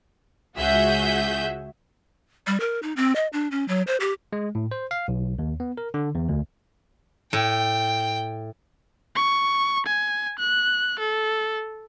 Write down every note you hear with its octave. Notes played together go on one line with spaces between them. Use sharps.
C#2 F#4 G#4 E5 G6
G3
A#4
D#4
C4
D#5
D4
C#4
F#3
C5
G4
G#3
A2
C5
F5
B1
D#2
B3
A#4
D3
E2
D2
A2 G5
C#6
G#5
F#6
A4